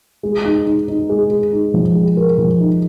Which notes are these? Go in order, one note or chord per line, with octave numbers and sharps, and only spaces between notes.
G#3
D#4
D#4
D#4
G#3
G#3
D#4
F3
G#3
A#4
F3
D#4